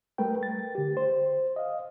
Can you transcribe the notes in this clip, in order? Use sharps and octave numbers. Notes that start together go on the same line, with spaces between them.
G3 A3 A#4 B4 G5
A6
D3 G4
C5
D#5 F5